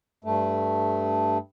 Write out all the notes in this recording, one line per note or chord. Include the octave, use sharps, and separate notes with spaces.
G2 A3